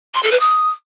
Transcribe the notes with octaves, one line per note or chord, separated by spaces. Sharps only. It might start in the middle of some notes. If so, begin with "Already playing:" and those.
C6
A4
B4
D#6